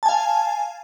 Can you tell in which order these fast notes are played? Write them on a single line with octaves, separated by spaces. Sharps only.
A5 G#5 F5